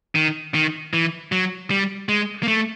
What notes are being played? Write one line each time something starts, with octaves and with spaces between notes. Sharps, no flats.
D#3
D#3
E3
F#3
G3
G#3
A#3
A3